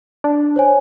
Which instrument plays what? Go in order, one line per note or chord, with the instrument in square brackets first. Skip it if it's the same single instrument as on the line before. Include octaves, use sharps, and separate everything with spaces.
[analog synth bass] D4
[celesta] C5 C#5 G#5